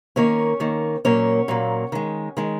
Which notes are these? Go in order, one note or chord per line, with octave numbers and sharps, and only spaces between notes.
D#3 A#3 C#4 C#5
D#3 A#3
A#2 F#3 A#3 C#4 C#5
A#2 F#3 A#3
D#3 G#3
D#3 G#3